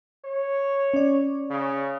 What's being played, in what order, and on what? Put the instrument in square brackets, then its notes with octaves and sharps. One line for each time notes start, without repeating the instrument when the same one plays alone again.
[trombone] C#5
[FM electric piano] C#4 D5
[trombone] C#3